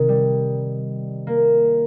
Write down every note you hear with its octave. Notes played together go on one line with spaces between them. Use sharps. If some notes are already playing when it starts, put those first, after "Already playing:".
Already playing: C3 D#3
G3
A#3